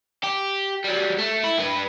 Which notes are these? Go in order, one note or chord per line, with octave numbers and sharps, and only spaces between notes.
G4
F#3 G3
A3
E4
G2 B4